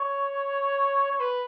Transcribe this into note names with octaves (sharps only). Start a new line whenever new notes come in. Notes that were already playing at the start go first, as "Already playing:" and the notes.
Already playing: C#5
C#5
B4